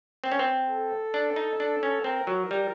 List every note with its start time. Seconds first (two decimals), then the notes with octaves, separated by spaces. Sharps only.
0.24 C4
0.32 C#4
0.39 C4
0.69 A4
1.14 D4
1.36 D#4
1.60 D4
1.83 C#4
2.04 C4 A#4
2.27 F#3
2.51 G3